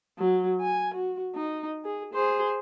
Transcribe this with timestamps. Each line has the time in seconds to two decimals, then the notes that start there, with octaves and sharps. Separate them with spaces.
0.19 F#3
0.61 G#5
0.95 F#4
1.35 D#4
1.85 G#4
2.14 G#4 C5